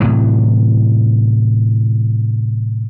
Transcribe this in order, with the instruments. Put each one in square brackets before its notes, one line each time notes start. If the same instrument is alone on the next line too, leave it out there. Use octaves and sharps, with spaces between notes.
[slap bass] A2 C3 E3 F#3